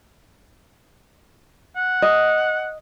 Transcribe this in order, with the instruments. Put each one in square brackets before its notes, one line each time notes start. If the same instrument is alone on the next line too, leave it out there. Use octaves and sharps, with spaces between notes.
[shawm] F#5
[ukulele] D#5